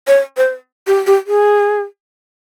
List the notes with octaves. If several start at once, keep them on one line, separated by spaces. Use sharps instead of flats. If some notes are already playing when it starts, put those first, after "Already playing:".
C#5
C5
G4
G4
G#4